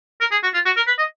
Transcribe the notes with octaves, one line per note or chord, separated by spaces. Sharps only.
A#4
G#4
F#4
F4
F#4
A#4
B4
D#5